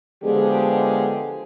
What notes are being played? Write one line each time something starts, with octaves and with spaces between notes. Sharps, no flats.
D3 F3 G#3 B3 G4 G#4